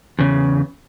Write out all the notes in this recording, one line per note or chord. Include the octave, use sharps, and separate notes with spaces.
E2 C#3